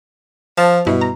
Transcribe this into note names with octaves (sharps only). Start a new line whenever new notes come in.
F3 A5
G2 B2 E4
A#5